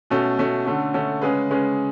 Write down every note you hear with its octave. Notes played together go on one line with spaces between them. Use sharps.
B2 A3 C#4
B2 A3 C#4
D3 A3 C#4
D3 A3 C#4
C#3 G#3 C#4 G#4 B4
C#3 G#3 C#4 G#4 B4